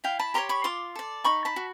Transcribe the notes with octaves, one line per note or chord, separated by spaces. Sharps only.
E4 F5 G5
A5 B5
G4 A#4 C#5 A#5 C6
B5 C#6
F4 C6 D6
A4 D5
D#4 B5 C#6
A5 B5
F#4